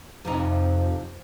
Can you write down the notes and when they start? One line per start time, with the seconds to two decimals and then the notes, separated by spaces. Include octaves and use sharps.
0.25 F2 C3 F3 D#4